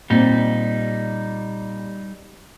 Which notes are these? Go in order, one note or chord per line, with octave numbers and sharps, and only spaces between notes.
A#2 G3 C4 D#4